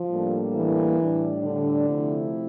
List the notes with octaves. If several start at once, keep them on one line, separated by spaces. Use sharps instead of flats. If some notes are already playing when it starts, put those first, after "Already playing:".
Already playing: F3
A2 G3 A#3 D4 A4
E3
A2 G3 D4
D3
C3 F3 A3 E4